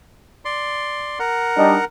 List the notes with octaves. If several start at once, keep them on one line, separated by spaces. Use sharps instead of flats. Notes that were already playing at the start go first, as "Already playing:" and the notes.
D5 C6
A#4 F#5
G3 D4 D#4